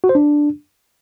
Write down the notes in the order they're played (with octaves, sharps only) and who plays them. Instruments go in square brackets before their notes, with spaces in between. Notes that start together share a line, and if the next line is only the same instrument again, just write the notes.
[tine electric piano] F#4
C5
D4